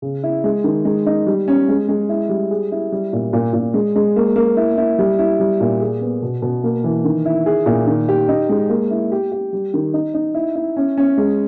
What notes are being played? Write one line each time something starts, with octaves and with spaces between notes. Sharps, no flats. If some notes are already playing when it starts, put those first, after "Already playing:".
C#3
E4
G#3
D#3
G#3
D#4
G3
C#4
G#3
G#3
E4
G3
G#4
E4
G3
A#2
A#2
A#2
G#3
G#3
A#3
A#3
E4
E4
G3
E4
G3
A#2
G#4
B3
B2
B2
A#3
E3
D#3
E4
G#4
A#2
D#3
G4
D#4
G#3
A#3
E4
G4
G4
G3
D#3
D#4
D#4
E4
E4
C#4
C#4
G#3